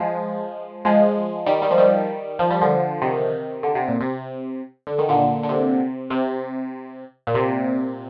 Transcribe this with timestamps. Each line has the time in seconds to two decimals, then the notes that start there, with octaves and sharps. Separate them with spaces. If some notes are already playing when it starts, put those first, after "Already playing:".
Already playing: F3 G#3
0.85 F3 G#3
1.46 D#3 G3
1.62 D#3 G3
1.71 F3
1.78 D#3 G3
2.39 F3
2.50 G3
2.61 D3 F3
3.02 C3 D#3
3.63 D3
3.75 C3
3.88 A#2
4.01 C3
4.87 D3
4.99 D#3
5.09 A#2 D3
5.43 D3
5.49 C3
6.10 C3
7.27 A#2
7.35 C3